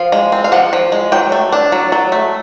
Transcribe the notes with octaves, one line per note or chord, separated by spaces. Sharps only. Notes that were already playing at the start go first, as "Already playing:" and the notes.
Already playing: F3 F5
G#3
C4
F5
F3 F#5
F3
G#3
F#3 G5
A3
D4
F#3
F#3
A3